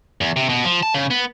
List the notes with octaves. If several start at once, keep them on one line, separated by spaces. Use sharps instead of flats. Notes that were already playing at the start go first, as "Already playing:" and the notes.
E2
C3
B2
F3
A5
C#3
B3